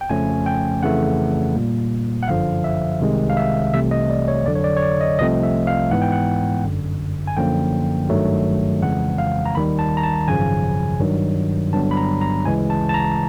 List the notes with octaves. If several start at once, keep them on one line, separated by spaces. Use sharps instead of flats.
G5
F2 C#3 F3 A3 C#4 G#5
G5
F2 C#3 E3 A3 F#5
A#2 G3 A#3
F#5
G1 F#2 D3 F3 F5
E5
C2 C3 D#3 G#3
F5
E5
C2 C3 E3 A3 E5
D#5
D5
C#5
F2 D3 F#3 D5
C#5
D5
C#5
D5
D#5
C2 C3 F3 A3 C4 D#5
E5
F5
G#2 E3 G#3 B3 F#5
G5
F#5
G1 F#2 D3
G#5
F#2 D3 F3 A#3 G5
G#1 G2 D#3 F#3 A3
F2 C#3 E3 G#3 F#5
F5
A#5
D#2 D#3 G3 B5
A5
A#5
A5
G#1 F#2 C#3 F3 G#5
G2 D#3 F#3
G1 G2 D3 F#3 B3 A5
B5
A#5
A#5
D2 C#3 E3 G#3 G#5
A5
A5
A#5